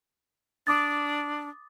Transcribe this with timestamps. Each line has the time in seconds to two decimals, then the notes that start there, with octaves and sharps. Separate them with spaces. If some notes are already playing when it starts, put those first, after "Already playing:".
0.67 D4 D6 D#6 A6